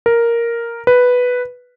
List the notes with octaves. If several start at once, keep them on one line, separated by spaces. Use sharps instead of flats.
A#4
B4